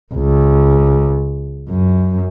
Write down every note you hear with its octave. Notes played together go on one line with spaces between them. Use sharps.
C#2
F#2